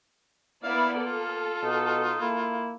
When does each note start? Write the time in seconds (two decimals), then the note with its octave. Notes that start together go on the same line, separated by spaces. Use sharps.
0.64 A#3 B3 E4 D5 F5
1.02 F4 A4
1.63 B2 D#4
2.21 A#3 E4